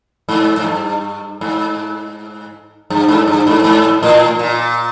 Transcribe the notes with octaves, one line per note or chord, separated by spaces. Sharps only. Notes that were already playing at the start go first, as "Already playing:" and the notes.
G#2
G#2
G2
G#2
G2
G#2
G2
G#2
G#2
A2
A#2